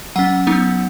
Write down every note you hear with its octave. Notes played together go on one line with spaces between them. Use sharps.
F#3 C#4 F#5
F#3 B3 D#4